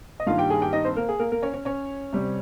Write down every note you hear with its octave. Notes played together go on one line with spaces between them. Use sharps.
D#5
G2 D#3 G3 A#3 F4 F5
G4 G5
G#4 G#5
G4 G5
D#4 D#5
C4 C5
A#3 A#4
G#4
A#3 A#4
A#3 A#4
C#4 C#5
C#4 C#5
C#4 C#5
C3 G3 C4